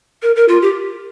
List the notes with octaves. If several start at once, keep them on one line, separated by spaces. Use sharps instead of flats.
A#4
A#4
F4
G4